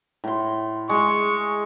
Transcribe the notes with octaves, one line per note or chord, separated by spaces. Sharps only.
A2 C6
G#3 G#4 C#6